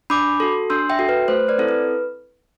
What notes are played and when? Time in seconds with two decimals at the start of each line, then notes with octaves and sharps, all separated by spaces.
0.10 D4 B5 D6
0.40 F#4 A4
0.70 D4 C6 E6
0.90 E5 G5
0.99 F#4 A4
1.09 B4
1.28 A3 C5
1.48 B4 D5
1.58 C4 E4 A4
1.69 B4